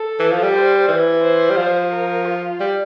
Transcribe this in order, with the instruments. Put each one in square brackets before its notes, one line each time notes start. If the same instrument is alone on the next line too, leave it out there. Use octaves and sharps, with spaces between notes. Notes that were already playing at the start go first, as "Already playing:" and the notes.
Already playing: [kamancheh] A4
[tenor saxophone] E3
F3
G3
[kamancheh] C5
[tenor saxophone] E3
[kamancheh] C5
[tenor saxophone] G3
F3
[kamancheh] A#4
F4
[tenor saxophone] G3